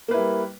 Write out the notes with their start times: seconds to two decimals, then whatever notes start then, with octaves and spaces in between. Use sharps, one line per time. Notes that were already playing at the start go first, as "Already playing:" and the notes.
0.08 A#3
0.11 B4
0.14 E4
0.17 G3